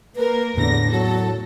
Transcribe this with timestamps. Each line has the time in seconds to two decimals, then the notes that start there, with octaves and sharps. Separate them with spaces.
0.16 A#3 A#4 B4
0.57 E2 A2 D3 A#6
0.92 F#3 A4